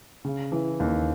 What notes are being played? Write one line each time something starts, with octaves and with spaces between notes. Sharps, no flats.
C#3
E3
D#2